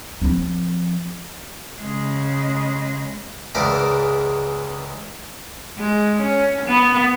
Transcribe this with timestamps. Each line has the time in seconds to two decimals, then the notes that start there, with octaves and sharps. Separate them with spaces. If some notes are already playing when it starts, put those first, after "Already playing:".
0.22 F3 C4
1.80 C#3 G#3
3.55 C#2 G#2 E3 A#4 D5
5.78 G#3
6.20 C#4
6.66 B3